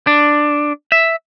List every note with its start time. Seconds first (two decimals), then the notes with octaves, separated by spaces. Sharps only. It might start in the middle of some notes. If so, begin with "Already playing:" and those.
0.07 D4
0.92 E5